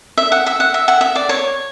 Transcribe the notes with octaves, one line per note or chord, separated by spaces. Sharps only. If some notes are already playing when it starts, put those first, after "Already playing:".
E5
F#5
E5
F#5
E5
F#5
E5
D5
C#5